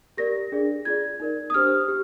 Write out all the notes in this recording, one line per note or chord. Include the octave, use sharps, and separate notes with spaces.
G4 A#4 D5 A#6
D4 G#4 D5
F4 G#4 D5 G#6
D#4 A#4 D5
D#6
D4 G4 C5 F6
G4